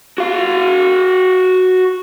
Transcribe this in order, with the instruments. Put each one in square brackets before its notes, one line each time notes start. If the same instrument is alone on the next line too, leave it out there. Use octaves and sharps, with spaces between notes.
[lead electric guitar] F#4 F5